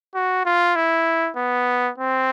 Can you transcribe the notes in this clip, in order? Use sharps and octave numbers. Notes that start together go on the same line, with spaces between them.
F#4
F4
E4
B3
C4